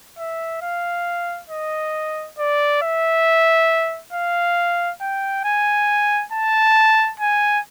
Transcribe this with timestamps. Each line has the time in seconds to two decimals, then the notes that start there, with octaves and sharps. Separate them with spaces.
0.18 E5
0.62 F5
1.50 D#5
2.38 D5
2.82 E5
4.13 F5
5.01 G5
5.44 G#5
6.32 A5
7.20 G#5